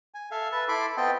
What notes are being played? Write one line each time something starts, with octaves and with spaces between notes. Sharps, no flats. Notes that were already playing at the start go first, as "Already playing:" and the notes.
G#5
A4 E5 F5
B4 E5 A5
E4 A4 B5 C6 D6
B3 C4 F4 D#5 G5 A5